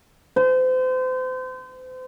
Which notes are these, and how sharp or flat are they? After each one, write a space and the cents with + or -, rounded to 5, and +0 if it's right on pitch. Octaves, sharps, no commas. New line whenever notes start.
C5 -35